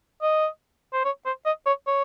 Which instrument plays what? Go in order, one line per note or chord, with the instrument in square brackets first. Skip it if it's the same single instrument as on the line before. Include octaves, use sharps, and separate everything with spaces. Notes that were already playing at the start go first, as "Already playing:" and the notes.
[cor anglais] D#5
C5
C#5
C5
D#5
C#5
C#5